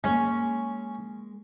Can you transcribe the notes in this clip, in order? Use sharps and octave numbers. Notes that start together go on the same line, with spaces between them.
G#3 A#3 C#4